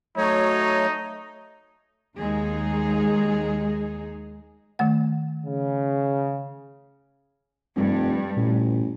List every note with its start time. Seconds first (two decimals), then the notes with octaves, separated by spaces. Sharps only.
0.17 F#3 A3 D#4 C#5
2.17 D#2 G#3 D#4 G#4
4.79 D#3 A3 F#5
5.45 C#3
7.76 F1 G2
8.37 A1 A#2